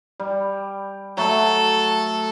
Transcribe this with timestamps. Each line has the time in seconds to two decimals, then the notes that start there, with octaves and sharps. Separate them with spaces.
0.20 G3
1.17 F#3 A3 A4